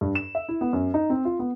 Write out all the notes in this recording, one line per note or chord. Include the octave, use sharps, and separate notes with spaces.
G2
E7
E5
E4
B3
F#2
D#4
C4
F4
B3